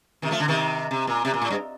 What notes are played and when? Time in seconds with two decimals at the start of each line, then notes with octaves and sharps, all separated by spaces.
0.22 C3 D#3
0.31 F3 A3
0.40 D3
0.48 C3 D#3
0.91 C3
1.07 A#2
1.25 C3
1.34 A#2
1.42 A2
1.51 G2